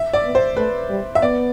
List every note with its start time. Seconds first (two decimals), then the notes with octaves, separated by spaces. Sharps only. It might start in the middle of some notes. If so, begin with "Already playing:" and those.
Already playing: E5
0.13 D5
0.24 B3
0.35 C5
0.56 A3 B4
0.89 G3
1.15 E5
1.22 B3 D5